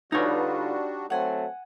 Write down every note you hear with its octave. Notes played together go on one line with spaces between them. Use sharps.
D3 G3 D4 D#4 F4 F#4 B4 C#5
F#3 A3 C4 F#5 G#5